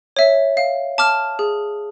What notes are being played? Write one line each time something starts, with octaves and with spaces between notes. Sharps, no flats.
C#5 E5
F5
A5 D6 F6
G#4